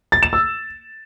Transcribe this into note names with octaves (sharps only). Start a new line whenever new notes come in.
A6
E7
E6